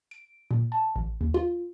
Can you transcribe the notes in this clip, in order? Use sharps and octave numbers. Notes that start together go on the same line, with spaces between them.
D7
A#2
A5
A1
D#2
F4